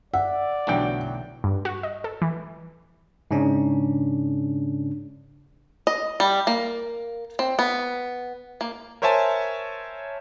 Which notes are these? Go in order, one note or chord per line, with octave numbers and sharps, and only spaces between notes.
D5 E5 F#5
B1 D3 E3 F#3 A3 G5
G2
F#4
D#5
A4
E3
G#2 C#3 C#4 D4
D#5
G3
A#3
C4
B3
A#3
A#4 C5 C#5 E5 G#5 A5